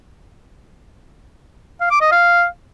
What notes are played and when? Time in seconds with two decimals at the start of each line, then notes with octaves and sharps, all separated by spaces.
1.80 F5
1.91 D6
2.01 D#5
2.11 F5